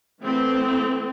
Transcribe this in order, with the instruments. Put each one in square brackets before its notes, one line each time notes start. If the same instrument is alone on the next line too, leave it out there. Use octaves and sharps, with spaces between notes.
[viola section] E3 A3 B3 C4